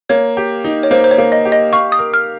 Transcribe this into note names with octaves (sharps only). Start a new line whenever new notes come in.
A#3 C#5
G4
D#4
C#5
A#3 C5
C5
C#5
A#3
D#5
G4
D#5
F5 C#6
D#6
A#4
F6